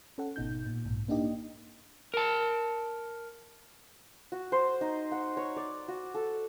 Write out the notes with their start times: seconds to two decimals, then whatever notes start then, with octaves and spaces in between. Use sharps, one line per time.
0.18 C#4 A4 F#5
0.36 G#1 B2 D#4 G6
0.66 A#2
0.85 B1 G#2
1.08 A#3 D4 D#4 G4 D#5
2.14 A#4 A5
4.32 F#4
4.52 C5
4.81 D#4
5.12 F#5
5.37 C#5
5.56 D5
5.88 F#4
6.15 A4